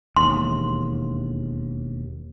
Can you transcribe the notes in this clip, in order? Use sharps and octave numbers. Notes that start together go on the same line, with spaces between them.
E1 D#2 C6